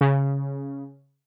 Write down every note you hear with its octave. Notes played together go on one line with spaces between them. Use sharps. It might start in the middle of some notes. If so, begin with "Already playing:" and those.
C#3